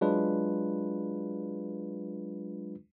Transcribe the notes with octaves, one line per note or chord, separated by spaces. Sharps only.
F#3 G#3 D4 F4 B4